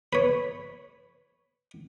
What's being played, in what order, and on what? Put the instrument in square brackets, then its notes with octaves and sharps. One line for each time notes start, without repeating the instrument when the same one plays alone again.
[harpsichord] B4 C#5